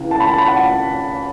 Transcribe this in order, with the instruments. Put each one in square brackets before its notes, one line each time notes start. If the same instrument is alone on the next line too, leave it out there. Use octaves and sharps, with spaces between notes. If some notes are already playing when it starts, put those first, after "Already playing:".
Already playing: [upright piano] C#2 C#3 E3
A5
B5
A5
B5
F#5 A5